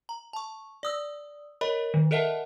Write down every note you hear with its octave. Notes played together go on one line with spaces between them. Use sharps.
A#5
A5 C#6
D5 D#6 E6
A#4 C#5 D#5 B5
D#3
A4 A#4 D#5 E5 F#5 A5